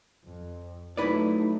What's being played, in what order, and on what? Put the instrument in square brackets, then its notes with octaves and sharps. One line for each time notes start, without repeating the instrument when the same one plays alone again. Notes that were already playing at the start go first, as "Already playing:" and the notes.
[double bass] F2
[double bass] F#3 A3 [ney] D#4 [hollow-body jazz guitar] E4 B4 D5